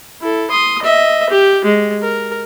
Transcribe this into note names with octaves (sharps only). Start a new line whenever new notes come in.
E4 A4
C6 D#6
D#5 E5
G4
G#3
A#4